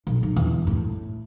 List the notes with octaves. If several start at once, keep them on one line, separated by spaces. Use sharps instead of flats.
B1
B1
E2
A2